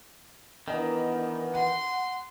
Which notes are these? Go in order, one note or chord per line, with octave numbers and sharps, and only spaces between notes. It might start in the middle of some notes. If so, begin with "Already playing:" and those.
D#3 E3 B3 D4 A#4 D#5
F#5 C6